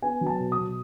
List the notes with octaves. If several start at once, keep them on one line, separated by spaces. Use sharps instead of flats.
B3 G#5
F#3
A5
B2
D#6
B2